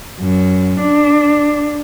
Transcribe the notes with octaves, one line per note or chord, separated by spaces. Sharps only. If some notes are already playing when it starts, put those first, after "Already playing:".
F#2
D4